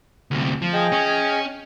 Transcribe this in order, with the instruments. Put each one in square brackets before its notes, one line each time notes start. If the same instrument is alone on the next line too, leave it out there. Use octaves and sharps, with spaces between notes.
[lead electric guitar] D2 C3
F3
[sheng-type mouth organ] G#4 D#5 G5
[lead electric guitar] C#4